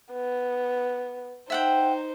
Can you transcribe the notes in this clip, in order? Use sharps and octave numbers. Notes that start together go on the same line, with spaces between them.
B3
D#4 C5 E5 F#5 G5